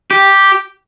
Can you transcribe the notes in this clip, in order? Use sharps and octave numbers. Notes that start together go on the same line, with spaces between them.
G4